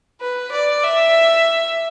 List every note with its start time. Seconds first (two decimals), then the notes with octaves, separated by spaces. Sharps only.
0.21 B4
0.52 D5
0.84 E5